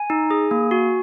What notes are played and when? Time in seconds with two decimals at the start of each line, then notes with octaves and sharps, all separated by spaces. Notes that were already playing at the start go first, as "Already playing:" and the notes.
Already playing: G#5
0.10 D#4
0.31 G#4
0.51 A#3
0.71 F#4